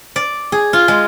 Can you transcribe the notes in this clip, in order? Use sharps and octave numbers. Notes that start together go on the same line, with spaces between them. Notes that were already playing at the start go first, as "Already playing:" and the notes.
D5
G#4
F4
G#3